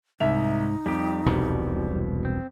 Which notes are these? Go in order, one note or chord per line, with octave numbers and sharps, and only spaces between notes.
C2 G#2 D#4 E5 F7
F2 G3 G4
E1 C2 B2 G3
C4